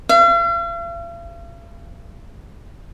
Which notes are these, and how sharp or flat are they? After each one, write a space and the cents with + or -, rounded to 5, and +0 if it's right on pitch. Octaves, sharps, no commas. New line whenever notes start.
F5 -45